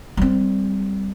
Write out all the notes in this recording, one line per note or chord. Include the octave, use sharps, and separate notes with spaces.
G3 C4